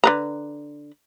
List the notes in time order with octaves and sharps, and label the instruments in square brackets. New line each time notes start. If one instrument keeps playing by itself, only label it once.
[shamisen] D3 B4 A#5